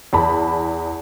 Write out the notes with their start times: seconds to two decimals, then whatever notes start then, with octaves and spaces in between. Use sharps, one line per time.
0.13 E2 A5 B5